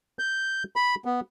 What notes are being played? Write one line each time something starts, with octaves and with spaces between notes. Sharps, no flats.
G6
B5
B3